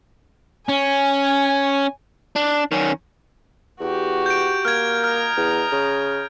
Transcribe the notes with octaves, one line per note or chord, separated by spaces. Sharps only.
C#4 G#5
D4
D#3 C#4
E2 F#4 G4
G6 D7
A#3 F6 G#6
D#5 A#5 F6
E2
C#3